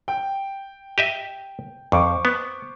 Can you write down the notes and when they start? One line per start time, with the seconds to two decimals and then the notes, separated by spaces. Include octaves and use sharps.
0.08 G5
0.98 G4 D#5 E5
1.92 F2 C5 C#6 D6
2.25 B3